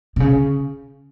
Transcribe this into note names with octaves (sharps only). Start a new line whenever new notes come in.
C3
C#3